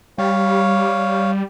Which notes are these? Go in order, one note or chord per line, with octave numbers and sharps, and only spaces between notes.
G3 C#5 F5